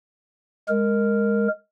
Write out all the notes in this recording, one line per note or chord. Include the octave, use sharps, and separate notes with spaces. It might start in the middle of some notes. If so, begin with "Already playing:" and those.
G#3 A#4